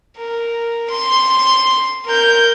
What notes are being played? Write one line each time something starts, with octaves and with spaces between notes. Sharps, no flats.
A#4
C6
A#4 G6